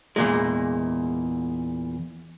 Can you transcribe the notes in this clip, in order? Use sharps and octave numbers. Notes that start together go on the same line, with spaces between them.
E2 A#2 G#3